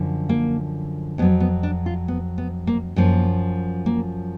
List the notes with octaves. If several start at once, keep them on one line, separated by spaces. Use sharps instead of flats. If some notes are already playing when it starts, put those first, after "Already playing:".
Already playing: F#2 D3 F3
A#3
F2 D#3 F#3 B3
B3
D4
F4
B3
B3
A#3
F#2 F3 A#3
A#3